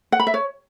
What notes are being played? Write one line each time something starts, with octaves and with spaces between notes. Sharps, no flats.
F#5
B5
E5
C#5